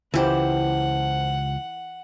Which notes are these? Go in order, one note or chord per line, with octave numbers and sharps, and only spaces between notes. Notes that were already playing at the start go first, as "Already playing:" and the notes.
C#2 E3 G4 C5 F#5 A5